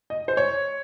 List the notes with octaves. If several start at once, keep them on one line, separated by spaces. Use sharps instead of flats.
D#5
C5
C#5